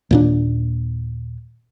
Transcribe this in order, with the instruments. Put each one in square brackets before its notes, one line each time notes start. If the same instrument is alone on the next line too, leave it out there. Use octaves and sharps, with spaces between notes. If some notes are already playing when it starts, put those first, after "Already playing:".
[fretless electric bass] D#2 A#2 D4